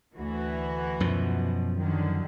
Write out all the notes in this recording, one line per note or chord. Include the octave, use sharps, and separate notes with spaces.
D2 E3 F#4
F#2 B2 F3
D3 D#3 F#3